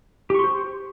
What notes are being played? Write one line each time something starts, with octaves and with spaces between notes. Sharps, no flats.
G4 C5 C6 C#6